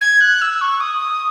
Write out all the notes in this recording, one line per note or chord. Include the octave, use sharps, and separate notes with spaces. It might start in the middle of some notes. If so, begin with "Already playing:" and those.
G#6
F#6
E6
C#6
D#6